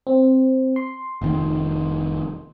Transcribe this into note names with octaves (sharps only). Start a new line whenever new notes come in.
C4
C6
F1 D#3